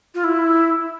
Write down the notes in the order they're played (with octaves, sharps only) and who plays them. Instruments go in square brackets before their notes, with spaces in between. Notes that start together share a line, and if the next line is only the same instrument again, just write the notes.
[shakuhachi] F4
E4